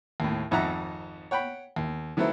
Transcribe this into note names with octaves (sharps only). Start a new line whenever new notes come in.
D#2 A2
G#1 F2 D#4 E5 F#5 A#5
C#5 F#5 G5 B5
D#2
D#3 F#3 A3 B3 C4 E4